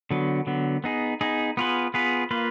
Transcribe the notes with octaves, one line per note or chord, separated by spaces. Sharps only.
D3 F#3 B3
D3 F#3 B3
B3 D#4 G#4
B3 D#4 G#4
B3 F4 G#4 B4
B3 F4 G#4 B4
A#3 F4 B4